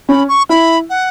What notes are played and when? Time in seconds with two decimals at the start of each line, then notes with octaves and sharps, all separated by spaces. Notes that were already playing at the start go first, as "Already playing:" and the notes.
0.09 C#4 B5
0.29 C#6
0.49 E4 B5
0.90 F#5